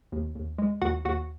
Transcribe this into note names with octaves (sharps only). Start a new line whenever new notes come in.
D#2
D#2
G#3
D#2 F#4 F#5
D#2 F#4 F#5